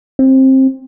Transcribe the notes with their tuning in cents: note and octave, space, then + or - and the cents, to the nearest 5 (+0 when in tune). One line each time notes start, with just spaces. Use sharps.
C4 +20